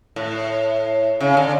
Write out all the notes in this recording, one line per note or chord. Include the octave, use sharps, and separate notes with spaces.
A2
C#3
D3